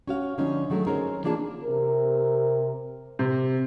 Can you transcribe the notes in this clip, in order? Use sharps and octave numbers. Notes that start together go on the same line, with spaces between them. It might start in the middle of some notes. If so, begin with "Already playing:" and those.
C#4 F#4 F5
D3 F3 C#4 D#4
D#3 F#3 G#3 A3
C4 C#4 D#4 G#4 A#4
E3 A#3 D4 F4 G#4 A5
C3 A#4
C3